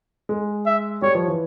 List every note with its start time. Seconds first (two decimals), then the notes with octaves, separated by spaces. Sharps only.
0.29 G#3
0.66 E5
1.02 G3 C#5
1.15 F3
1.28 E3